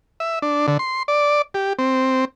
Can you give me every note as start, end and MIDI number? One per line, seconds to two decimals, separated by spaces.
0.20 0.39 76
0.42 0.66 62
0.68 0.78 50
0.79 1.03 84
1.08 1.42 74
1.54 1.73 67
1.79 2.25 60